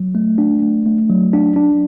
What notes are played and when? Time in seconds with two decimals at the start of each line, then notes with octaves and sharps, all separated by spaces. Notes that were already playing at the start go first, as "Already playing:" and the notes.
Already playing: F#3
0.15 A3
0.38 D4
0.62 A3
0.86 A3
1.09 F#3
1.33 D4
1.56 D4